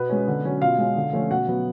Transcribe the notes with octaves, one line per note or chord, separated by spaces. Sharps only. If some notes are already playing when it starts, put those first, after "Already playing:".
Already playing: B2 B3 B4
G#3 C#4
D3
F#3 C#4
B2 F4 F5
G#3 C#4
D3
F3 A3 C#4
B2 F#4 F#5
F#3 B3